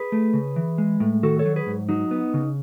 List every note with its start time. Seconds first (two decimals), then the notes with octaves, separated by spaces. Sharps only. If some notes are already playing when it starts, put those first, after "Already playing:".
Already playing: G#4 B4
0.12 A3
0.33 C#3
0.56 E3
0.78 G#3
1.00 A2
1.23 D#3 F#4 A4
1.39 A4 C#5
1.45 F#3
1.56 G#4 B4
1.67 G#2
1.89 F#3 D#4
2.11 B3
2.34 C#3